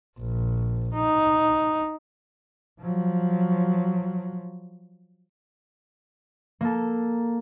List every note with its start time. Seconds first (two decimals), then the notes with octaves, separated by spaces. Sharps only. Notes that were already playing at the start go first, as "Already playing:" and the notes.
0.19 A#1
0.94 D#4
2.81 F3 F#3
6.61 A#3 A4